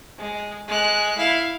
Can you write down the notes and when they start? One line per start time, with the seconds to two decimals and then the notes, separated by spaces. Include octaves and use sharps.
0.19 G#3
0.68 G#3 F#6
1.17 E4 F5